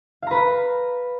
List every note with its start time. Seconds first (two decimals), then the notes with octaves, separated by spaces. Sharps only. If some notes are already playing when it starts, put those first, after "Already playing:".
0.22 F5
0.27 A#5
0.31 B4
0.35 B5